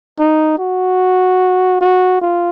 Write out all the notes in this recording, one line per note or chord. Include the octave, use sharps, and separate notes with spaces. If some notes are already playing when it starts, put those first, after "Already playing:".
D#4
F#4
F#4
F4